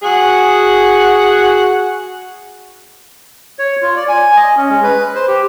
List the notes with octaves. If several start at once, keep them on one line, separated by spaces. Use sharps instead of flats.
F#4 G#4
C#5
F4
D5
G#5
D#5
C#4
G#3
B4
C5
G4